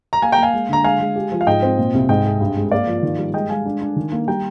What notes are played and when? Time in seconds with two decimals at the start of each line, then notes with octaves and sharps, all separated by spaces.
0.13 A#5
0.22 A#3 F5 G#5
0.32 G5 A#5
0.38 A#3
0.43 F5 G#5
0.53 G#3
0.69 D3 A#5
0.84 G#3 F5 G#5
1.00 G#3
1.16 G4
1.32 F3
1.41 F5
1.47 G#2 D#5 G5
1.63 C4
1.78 A#2
1.94 C2
2.09 G#2 D#5 G5
2.25 G#4
2.41 G2
2.56 G#3
2.72 A#3 D5 F5
2.87 F3
3.02 D#3
3.18 G3
3.34 G#3 D#5 G5
3.49 G#3 F5 G#5
3.66 D4
3.81 D4
3.96 D#3
4.12 A#3
4.28 G3 G5 A#5